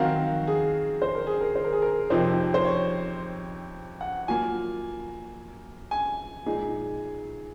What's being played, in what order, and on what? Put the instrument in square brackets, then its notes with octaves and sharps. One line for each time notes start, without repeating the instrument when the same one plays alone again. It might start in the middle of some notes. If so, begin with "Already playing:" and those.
Already playing: [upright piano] D#3 F#3 C4 F#4 A#4 [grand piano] F5
[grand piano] G#4
C5
A#4
G#4
A#4
C5
A#4
G#4
A#4
[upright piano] F2 C3 F3 C4 D#4 [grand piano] C5
[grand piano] C5
C#5
F#5
[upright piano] F#3 A#3 F4 [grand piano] G#5
[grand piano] G#5
[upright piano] A#2 G#3 D#4 G#4